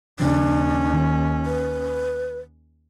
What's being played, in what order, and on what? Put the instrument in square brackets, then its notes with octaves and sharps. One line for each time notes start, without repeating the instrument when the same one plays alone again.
[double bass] D#2 C#4 [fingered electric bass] C#3 F3 [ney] D4
[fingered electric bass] D#3
[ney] B4